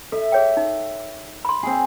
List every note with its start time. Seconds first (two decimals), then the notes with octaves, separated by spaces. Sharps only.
0.12 A4 E5
0.32 G#4 C#5 G5
0.57 D#4
1.45 B5 C6
1.63 C4 G#4